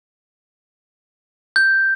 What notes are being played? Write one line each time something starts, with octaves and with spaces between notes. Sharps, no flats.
G6